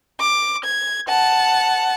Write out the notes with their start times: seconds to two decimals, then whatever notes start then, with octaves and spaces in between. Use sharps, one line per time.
0.20 D6
0.65 G#6
1.08 F#5 A5